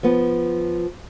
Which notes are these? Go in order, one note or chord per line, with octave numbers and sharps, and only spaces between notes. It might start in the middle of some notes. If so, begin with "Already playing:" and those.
F3 B3